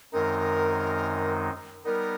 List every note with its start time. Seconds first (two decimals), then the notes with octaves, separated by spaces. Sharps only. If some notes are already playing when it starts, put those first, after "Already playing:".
0.13 F#2 D#3 G#3 C4 D#4 A#4
1.85 G3 B3 D#4 A#4